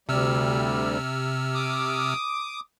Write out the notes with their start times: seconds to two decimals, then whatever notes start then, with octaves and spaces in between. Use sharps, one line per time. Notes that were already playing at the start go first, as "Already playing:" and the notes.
0.09 D2 C3 G3 E6 F6
1.55 D6 D#6